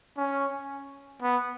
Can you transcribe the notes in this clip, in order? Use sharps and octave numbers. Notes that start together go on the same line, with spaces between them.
C#4
B3